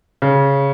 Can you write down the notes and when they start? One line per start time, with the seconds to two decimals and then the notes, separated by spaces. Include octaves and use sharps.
0.22 C#3